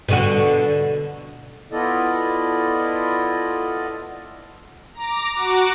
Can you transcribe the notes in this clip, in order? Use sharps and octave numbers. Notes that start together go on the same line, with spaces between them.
B2 D3 F#4
B3 E4 F4 A4 D5 D#5
A#5 D6
F#4 D6